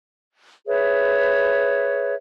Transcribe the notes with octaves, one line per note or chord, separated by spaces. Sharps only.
G#4 B4 C#5 E5